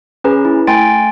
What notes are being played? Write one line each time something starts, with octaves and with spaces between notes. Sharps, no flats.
C#4 G#4 B4 A#5
E4
A3 G5 G#5 C6 A6 D7